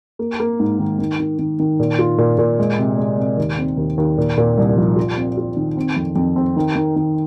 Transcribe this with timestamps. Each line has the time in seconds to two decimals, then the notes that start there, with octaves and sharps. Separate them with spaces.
0.19 A#3
0.40 A#3
0.60 G#2
0.79 D#3
0.99 D#3
1.20 D#3
1.39 D#3
1.59 D#3
1.79 A#2
1.99 F4
2.18 A#2
2.38 A#2
2.59 G#3
2.78 C3
2.98 G#3
3.18 C3
3.37 D#2
3.58 C4
3.77 D#2
3.98 D#2
4.18 A#2
4.37 A#2
4.57 C2
4.76 F3
4.96 F4
5.17 C4
5.37 F4
5.57 D#3
5.77 C4
5.96 F2
6.16 F2
6.36 C4
6.57 D#3
6.75 D#3
6.96 D#3